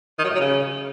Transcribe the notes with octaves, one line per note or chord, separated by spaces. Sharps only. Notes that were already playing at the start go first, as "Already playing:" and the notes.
D#3
F#3
A2
F#3
C#3